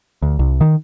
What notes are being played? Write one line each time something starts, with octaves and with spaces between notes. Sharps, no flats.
D2
C2
D#3